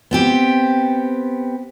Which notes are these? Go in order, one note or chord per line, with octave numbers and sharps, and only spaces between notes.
B3 C4 G4